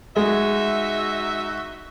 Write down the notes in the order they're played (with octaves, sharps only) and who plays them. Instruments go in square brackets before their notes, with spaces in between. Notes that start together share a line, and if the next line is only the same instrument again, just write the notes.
[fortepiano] G#3 [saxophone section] D#4 F#4 E5